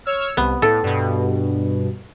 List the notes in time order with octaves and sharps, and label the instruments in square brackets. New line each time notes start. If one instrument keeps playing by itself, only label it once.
[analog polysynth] C#5 E6 F6
[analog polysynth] C2 [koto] B3
[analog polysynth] A2 [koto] A4
[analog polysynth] G2 B2